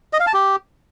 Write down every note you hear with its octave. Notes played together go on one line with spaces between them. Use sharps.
D#5
F5
A5
G4